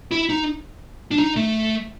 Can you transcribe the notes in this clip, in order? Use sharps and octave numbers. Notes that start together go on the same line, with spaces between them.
E4
D#4
D4
D#4
A3